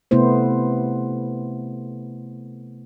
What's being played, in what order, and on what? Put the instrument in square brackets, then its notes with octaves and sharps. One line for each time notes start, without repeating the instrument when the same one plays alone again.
[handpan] C3 A3 B3 E4 C5